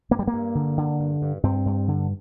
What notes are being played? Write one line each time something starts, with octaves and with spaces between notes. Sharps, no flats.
G2 A#3
G3
A#3
G2
D3
D3
G2
G2
G2 C4
G2
D3